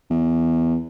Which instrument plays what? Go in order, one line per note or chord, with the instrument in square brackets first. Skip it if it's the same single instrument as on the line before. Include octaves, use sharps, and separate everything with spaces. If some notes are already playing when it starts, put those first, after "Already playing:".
[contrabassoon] E2